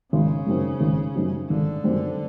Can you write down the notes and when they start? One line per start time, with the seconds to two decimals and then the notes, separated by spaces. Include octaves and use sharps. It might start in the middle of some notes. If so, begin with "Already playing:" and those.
0.13 G#1 C#3
0.47 F#2 D#3 G3 C4
0.81 G#1
1.16 F#2 D#3 G3 C4
1.50 G#1 D3
1.84 F#2 D#3 G3 C4